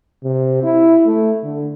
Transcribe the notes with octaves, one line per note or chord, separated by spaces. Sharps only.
C3
E4
A3
D3